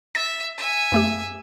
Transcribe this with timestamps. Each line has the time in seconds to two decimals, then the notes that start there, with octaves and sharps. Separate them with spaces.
0.15 E5 A6
0.58 E5 G#5
0.92 F#2 A3 G4